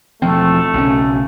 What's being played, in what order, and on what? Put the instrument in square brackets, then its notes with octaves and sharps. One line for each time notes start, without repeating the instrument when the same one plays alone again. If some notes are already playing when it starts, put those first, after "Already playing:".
[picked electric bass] E1 F3 C4 [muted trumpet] A3
[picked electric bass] B1 C#3 C#4